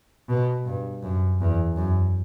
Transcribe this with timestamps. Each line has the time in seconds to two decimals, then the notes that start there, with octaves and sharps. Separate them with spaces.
0.29 B2
0.66 G2
1.02 F#2
1.40 E2
1.76 F#2